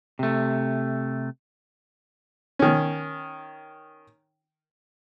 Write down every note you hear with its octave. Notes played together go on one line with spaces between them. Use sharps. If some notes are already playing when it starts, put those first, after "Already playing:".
C3 A3
D#3 C#4